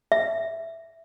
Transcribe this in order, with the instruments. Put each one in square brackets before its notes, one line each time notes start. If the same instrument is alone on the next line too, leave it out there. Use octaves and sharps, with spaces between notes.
[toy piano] E5